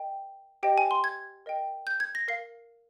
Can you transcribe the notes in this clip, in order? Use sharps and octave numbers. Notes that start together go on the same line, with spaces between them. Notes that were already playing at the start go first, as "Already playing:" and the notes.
Already playing: A#4 D#5 G5
G4 C5 D#5 G5
G#5
C6
G#6
A#4 D#5 G5
G6
G#6
A#6
A#4 F5 C7